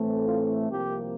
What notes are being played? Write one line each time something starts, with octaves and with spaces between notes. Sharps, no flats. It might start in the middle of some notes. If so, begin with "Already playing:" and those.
Already playing: A2 E3 A3 C4
F4
C2 C3 F3 A#3 G4